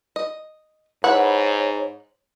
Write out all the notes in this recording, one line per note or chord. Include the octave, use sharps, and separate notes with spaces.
D#5
G#2 E4 B4 C#5 F#5